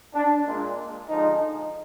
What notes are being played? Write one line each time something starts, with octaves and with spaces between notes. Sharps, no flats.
D4
A#2 G#3
D3 F3 G#3 D#4